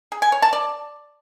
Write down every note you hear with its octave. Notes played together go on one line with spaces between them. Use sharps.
G#4
G#5
C#5
A5
D5